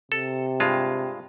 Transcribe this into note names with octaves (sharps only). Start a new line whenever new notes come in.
C3 A4
G2 G#3 F4